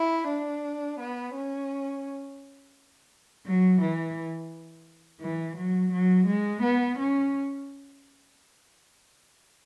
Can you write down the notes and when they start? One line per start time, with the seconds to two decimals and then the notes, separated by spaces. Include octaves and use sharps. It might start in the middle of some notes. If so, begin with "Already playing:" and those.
Already playing: E4
0.28 D4
0.99 B3
1.34 C#4
3.46 F#3
3.81 E3
5.21 E3
5.57 F#3
5.92 F#3
6.27 G#3
6.62 B3
6.97 C#4